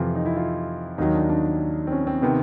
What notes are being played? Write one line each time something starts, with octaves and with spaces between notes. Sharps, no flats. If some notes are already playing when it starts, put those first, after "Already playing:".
Already playing: F2 C3 E3 F4
D#4
E4
F4
D#2 D#3 F#3 D#4
D4
D4
C4
C#4
C4
C3 D#3 B3